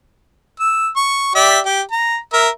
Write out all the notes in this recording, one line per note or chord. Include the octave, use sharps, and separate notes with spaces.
E6
C#6
G4 D5 E5
G4
A#5
A#4 E5